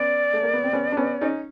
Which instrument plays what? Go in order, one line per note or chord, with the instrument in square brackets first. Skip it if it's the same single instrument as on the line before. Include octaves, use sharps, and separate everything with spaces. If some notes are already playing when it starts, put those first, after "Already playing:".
Already playing: [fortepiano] B3 C#4 [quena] D5
[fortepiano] A3
A#3
B3
C4
B3 C#4
D4
B3 C#4
C#4 D#4